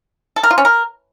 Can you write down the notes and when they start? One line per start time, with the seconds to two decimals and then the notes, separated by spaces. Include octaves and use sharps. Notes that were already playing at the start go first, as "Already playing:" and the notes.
0.36 A4
0.43 A#4
0.51 F4
0.58 C#4
0.65 A#4